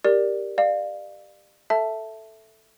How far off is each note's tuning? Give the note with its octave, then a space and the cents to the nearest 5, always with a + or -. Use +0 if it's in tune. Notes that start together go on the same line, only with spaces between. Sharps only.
G4 +5 A#4 +0 D5 +0
D5 +35 F5 +0
A4 +0 E5 +0 A5 +0